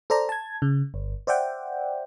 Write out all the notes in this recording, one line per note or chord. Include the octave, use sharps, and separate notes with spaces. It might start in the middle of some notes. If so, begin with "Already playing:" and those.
A4 C5 D5 A#5
A5 G#6
C#3
G1
C5 D5 E5 F#5 G5